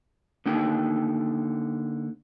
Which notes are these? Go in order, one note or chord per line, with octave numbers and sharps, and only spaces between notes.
D3 A#3 D#4 G5